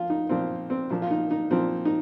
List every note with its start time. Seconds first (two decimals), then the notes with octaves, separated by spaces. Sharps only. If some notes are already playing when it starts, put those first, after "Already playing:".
Already playing: F3 F4
0.10 D#4
0.29 A#2 F3 C4
0.70 C4
0.90 A#2 F3
1.02 F4
1.11 D#4
1.31 D#4
1.50 A#2 F3 C4
1.85 D#4